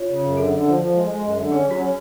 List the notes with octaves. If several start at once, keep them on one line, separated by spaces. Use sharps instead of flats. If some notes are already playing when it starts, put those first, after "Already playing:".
Already playing: F4 C#5
C#3
F#2
D3 A4
D3
F3
F3
G#3
G#3
F#2
D3
C#4 G#4
F#3 F#4
C#4